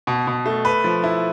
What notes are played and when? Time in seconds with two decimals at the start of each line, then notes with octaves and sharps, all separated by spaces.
0.07 B2
0.27 B2
0.46 A3
0.65 B4
0.84 F3
1.04 E4